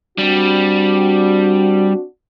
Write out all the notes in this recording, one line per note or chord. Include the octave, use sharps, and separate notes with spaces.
G3 C4 D4 F#4